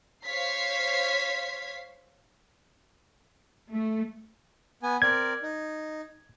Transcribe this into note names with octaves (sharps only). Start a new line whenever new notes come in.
C5 C#5 F5 G#6 B6 C7
A3
B3 G#5
C4 A#4 D5 G#6
D#4